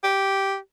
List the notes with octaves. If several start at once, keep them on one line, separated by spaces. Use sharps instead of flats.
G4